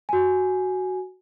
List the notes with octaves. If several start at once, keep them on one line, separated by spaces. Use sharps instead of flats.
F#4 G#5